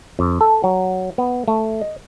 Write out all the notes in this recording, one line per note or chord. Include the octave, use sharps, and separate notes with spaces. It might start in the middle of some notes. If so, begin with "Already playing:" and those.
F2
A4
F#3
B3
A3
D#5